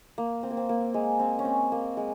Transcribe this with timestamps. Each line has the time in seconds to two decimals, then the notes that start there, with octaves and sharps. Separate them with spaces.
0.18 A#3
0.43 C4
0.51 A#3
0.57 C4
0.69 A#3
0.94 G#3
1.19 C4
1.39 C#4
1.45 C4
1.72 A#3
1.97 G#3